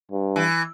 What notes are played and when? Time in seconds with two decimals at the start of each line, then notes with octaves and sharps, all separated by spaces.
0.11 G2
0.36 E3